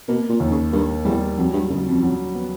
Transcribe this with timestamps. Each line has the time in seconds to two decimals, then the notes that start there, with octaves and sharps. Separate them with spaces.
0.08 B2 A#3
0.29 A#2
0.40 D#2
0.51 C#3
0.73 G2 A#3
1.05 E2 G3
1.38 F2 F#3
1.54 G2
1.70 F#2 C#3
1.86 F2
2.03 F#3
2.34 B3